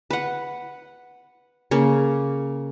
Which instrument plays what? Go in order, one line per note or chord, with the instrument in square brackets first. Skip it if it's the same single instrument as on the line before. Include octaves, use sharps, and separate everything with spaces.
[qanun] B4 F#5
C#3 A#3